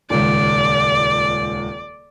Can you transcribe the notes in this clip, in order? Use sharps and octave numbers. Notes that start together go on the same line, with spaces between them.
D#1 C#2 D5